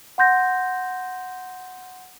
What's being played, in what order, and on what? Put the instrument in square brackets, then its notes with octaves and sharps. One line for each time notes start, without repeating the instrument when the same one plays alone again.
[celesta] F#5 C6 G6 A#6